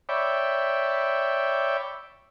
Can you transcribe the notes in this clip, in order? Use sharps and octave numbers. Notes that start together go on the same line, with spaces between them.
C#5 D5 E5 G5 B5